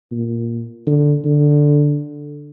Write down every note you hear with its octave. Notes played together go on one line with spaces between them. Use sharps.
A#2
D3
D3